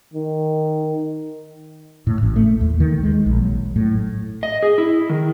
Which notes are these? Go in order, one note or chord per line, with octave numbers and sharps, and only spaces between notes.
D#3
A2
A1
A3
D#2
D#3
G#3
A#1
F#3
A2
D#5
G#4
E4
D#3